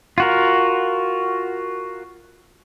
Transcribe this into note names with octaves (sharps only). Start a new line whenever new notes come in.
F4 F#4 A#4